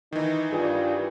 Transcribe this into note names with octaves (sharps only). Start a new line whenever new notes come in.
D#3 E3 D#4
G2 F4 G#4